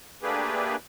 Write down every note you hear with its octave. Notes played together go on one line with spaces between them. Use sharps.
A3 A#3 D4 G4 G#4 B4